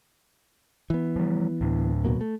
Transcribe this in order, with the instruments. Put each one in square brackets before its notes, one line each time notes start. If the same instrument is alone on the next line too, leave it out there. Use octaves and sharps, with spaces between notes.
[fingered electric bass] E3 B3
[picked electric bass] F3 G3
D2 A2 D4
[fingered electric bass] B2 F#3 A#3
A3